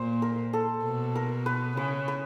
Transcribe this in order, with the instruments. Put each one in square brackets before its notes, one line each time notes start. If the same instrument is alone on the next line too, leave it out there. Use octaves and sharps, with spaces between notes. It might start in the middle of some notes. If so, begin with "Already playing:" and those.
Already playing: [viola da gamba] A#2 [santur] C5
[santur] A#4
A4
[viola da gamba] B2
[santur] A#4
B4
[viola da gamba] C#3 [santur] B4
[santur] B4